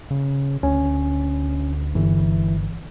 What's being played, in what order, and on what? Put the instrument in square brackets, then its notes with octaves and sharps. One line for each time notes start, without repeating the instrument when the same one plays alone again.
[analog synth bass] C#3
[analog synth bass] D2 [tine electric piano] C#4
[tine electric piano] G1 [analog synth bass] E3